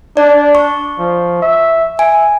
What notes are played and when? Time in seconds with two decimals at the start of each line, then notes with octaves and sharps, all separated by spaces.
0.17 D4 D5
0.55 C#6
0.98 F3
1.42 E5
1.99 E5 G#5